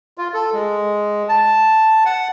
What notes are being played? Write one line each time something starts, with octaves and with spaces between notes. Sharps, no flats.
F4
A4
G#3
A5
F#5